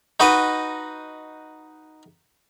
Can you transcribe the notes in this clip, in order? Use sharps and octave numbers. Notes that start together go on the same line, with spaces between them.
D#4 F#4 B4 D#5